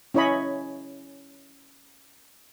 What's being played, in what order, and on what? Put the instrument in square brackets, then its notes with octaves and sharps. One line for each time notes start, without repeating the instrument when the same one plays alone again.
[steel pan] C#4 E4 C#5 D#5 B5